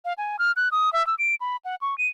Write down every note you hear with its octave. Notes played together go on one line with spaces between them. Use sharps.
F5
G#5
F6
F#6
D#6
E5
E6
D7
B5
F#5
C#6
D#7